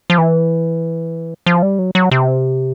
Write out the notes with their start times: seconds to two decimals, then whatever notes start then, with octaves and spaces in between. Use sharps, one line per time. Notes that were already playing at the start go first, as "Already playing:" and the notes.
0.10 F3
0.18 E3
1.46 F3
1.62 G3
1.79 F#3
1.95 F#3
2.11 C3